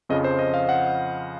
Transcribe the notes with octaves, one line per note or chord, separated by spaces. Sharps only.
F2 C#3 F3 D#5
C5
D#5
F5
F#5